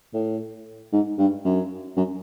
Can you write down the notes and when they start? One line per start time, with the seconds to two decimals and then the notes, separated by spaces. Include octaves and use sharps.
0.14 A2
0.93 G#2
1.18 G2
1.45 F#2
1.97 F#2